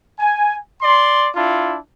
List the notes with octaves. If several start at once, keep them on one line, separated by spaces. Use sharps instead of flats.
G#5
D5 C6
D4 E4 F4